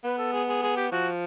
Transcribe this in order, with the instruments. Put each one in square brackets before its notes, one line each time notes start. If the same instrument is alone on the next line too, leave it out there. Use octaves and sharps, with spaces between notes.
[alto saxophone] B3 [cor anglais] B4
[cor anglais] A4
G#4
G#4
G#4
G4
[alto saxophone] F3 [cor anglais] F#4